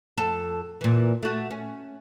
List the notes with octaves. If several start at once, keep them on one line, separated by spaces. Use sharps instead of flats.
F2 A4
A#2 E3
A3 F#4
C#4